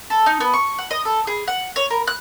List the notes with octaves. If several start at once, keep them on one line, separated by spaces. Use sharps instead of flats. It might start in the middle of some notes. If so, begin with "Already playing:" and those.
A4
D#4
B3
C#6
F#5
D#5
A4
G#4
F#5
C#5
A#4
F#6